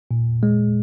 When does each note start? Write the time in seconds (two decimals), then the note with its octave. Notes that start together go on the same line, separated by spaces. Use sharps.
0.11 A#2
0.43 G#3